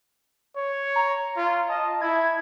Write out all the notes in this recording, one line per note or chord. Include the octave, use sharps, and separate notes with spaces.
C#5
A#5
F4
D#5 A5
E4 G#6